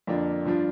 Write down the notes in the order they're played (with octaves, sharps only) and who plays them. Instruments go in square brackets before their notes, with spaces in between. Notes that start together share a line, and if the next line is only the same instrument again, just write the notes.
[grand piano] F2 D3 A#3 D4 F4
G2 F3 D4 F4